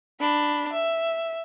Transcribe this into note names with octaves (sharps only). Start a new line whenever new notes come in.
D4 B5
E5